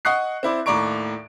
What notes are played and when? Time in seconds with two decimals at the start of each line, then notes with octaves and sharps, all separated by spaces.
0.05 D#5 F#5 C#6 D#6 F#6 C7
0.43 C4 E4 D5
0.66 D#2 A2 D5 A#5 C#6 D7